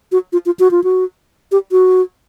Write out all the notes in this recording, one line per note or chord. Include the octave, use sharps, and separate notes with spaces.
F#4
F4
F4
F#4
F4
F#4
G4
F#4